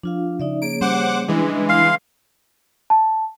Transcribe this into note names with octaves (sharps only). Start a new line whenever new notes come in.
F3 D4 F4 F5
C#3 D#4 D5 E5
A#3 G#4 C#5 D7
G3 C#4 C5 F#5 D6
E3 G#3 D4 E4 B4
F5 C6
A5